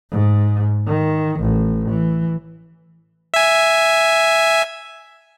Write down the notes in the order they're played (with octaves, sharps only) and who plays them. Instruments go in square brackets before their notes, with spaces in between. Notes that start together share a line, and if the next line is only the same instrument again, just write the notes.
[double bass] G#2
D#3
A1
E3
[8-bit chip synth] E5 G#5